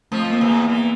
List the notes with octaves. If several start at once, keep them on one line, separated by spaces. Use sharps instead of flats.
F2 F3 A3
A#3
E2 E3
B3
E2 E3 A#3